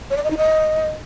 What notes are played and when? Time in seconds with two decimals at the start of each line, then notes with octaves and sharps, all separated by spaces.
0.10 C#5
0.17 D5
0.23 D#5
0.30 D#4
0.37 D#5